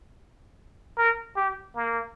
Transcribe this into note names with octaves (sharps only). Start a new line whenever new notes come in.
A#4
G4
A#3